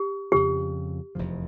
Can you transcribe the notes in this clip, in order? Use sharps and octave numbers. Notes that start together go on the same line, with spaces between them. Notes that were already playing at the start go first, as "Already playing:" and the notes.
Already playing: G4
F2 C#3 F3 G4
F1 E2 C3 F3